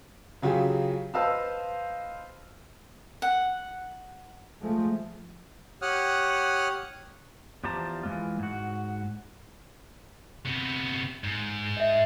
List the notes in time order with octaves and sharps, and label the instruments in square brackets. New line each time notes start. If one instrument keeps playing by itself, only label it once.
[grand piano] C#3 F#3 F4 G4 G#4
B4 C5 D#5 F5 A5 E6
[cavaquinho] F#5
[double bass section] F3 G#3 A3
[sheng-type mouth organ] G4 C#5 F#5 D#6 F6 F#6
[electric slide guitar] E2 F3 G4 C5 A5 A#5
E3 G#3 F4
G#2 F#4
[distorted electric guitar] C3 B3
G#2
[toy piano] D#5 E5